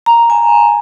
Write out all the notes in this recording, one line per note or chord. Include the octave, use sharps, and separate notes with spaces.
A#5
G#5